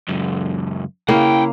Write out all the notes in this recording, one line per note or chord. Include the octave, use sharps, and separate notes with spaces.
C#2 F#2
C#3 A#3 E4 F#5 G5